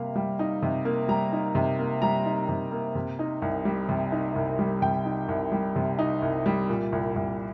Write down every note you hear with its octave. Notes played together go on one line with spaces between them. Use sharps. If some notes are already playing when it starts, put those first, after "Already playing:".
Already playing: C3 G3 A#3 F5
G3
D#4
C3
A#3
G3 A#5
D#4
C3
A#3
G3 A#5
D#4
C3
A#3
C3
D#4
C2
G3
C3
D#4
C2
G3
C3 G5
D#4
C2
G3
C3
D#4
C2
G3
A#2
C2
C2